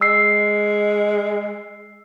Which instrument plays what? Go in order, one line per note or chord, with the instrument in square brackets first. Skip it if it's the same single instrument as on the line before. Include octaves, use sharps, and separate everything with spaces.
[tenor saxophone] G#3 [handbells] E6 C7